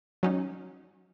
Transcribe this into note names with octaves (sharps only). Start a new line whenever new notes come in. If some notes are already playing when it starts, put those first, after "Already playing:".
F#3 C#4 D#4